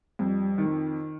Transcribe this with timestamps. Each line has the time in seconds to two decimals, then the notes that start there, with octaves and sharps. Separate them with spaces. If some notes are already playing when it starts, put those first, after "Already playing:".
0.19 F2 G3
0.58 D#3